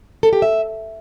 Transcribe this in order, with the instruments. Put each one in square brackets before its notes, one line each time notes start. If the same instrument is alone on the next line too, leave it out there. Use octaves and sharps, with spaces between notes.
[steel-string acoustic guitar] A4
G4
E5